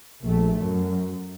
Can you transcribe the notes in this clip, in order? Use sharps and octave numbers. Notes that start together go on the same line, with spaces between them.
A#1 A3
F#2